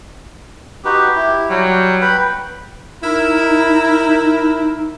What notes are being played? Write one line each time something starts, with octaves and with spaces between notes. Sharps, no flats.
D#4 F#4 G4 B4
E4
F#3 G3 G5
B4 G5 B5
D#4 E4 A#4